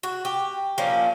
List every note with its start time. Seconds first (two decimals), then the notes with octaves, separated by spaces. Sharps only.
0.03 F#4
0.25 G4
0.78 A#2 F3 A#3 C#4